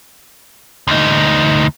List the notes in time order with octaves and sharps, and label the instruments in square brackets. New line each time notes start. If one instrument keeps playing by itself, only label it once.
[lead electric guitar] D2 D#4